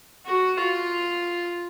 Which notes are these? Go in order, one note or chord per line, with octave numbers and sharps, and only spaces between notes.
F#4
F4